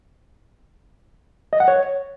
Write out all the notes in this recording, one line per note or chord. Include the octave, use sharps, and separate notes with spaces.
D#5
F#5
C#5